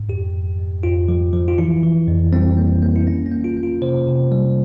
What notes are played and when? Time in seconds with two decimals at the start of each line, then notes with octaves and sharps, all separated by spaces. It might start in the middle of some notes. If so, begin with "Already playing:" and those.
Already playing: G#2
0.09 F2 G4
0.34 F2
0.59 F2
0.83 F2 F4
1.08 F3
1.33 F3
1.48 F4
1.58 E3 E4
1.83 E3
2.08 F2
2.33 G3 C4
2.57 A#3
2.82 A#3
2.96 E4
3.07 A#3 C#4
3.26 C#4
3.32 A#3
3.44 F4
3.57 A#3
3.63 F4
3.82 C3 C5
4.07 C3
4.32 G3